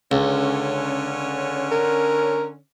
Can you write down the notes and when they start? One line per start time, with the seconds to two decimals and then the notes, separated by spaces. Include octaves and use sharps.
0.12 C#2 D3 C#4
1.71 A#4